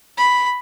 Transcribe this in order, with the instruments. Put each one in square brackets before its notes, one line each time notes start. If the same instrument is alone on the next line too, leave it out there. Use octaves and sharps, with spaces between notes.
[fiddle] B5